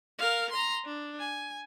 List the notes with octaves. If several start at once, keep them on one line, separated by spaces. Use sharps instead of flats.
A#4 F5
A#5 C6
D4
G#5